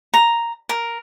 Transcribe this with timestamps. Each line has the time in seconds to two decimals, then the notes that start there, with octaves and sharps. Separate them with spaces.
0.14 A#5
0.69 A#4